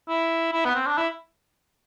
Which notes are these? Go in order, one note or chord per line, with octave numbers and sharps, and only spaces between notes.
E4
E4
B3
C4
D4
E4